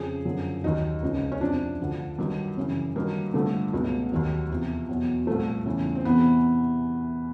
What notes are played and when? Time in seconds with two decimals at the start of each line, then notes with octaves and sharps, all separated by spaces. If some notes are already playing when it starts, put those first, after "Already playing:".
Already playing: F2 C#3 F3 G#4
0.25 F#2 D3 F3
0.63 D#2 D#3 F#3 D#4
1.03 C#2 C#3 F3
1.32 C#4
1.41 F2 C3 F3 D4
1.80 D2 D3 F3
2.18 G2 D#3 F#3
2.57 F#2 C#3 E3
2.96 G2 D#3 F#3 A#3
3.34 G2 D3 F3 A3
3.73 C#2 B2 F#3
4.12 D#2 D#3 F#3
4.50 E2 C3 F3
4.89 E2 B2 F#3
5.27 C2 A#2 F3 A3
5.66 E2 C#3 E3
5.95 C4
6.05 E2 C3 E3 B3